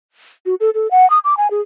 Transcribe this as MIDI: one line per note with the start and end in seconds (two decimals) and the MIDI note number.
0.46 0.55 66
0.60 0.70 69
0.74 0.90 69
0.91 1.08 78
1.10 1.19 87
1.24 1.37 86
1.37 1.50 80
1.50 1.61 68